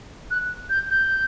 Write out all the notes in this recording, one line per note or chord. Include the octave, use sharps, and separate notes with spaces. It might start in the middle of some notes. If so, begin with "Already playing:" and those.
F#6
G6
G6